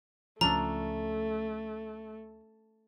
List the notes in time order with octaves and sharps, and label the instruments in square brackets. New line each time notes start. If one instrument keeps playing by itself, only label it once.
[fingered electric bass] C#2 F3 [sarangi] A3 [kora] C#4 D4 A4 [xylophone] A#5